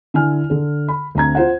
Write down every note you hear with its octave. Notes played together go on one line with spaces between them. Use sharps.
D3 E4 G#5 F6
D3 A4
B5
D2 C4 A#5 G#6
F4 C5 F#5